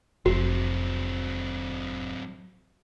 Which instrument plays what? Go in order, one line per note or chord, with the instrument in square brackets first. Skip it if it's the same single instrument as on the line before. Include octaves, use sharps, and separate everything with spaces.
[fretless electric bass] F1 [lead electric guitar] F#3 C4 [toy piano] F#4